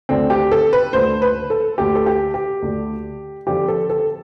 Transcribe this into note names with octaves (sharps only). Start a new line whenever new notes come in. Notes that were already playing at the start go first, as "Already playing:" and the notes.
D2 D3 C4
G4
A4
B4
D2 D3 C5
B4
A4
D2 D3 G4
A4
G4
G4
D2 D3
F2 D3 G4
A4
A4